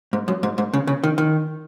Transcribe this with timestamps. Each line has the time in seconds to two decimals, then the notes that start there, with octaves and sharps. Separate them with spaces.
0.13 G#2
0.28 F#2
0.43 G#2
0.58 G#2
0.74 C#3
0.87 C#3
1.04 D#3
1.18 D#3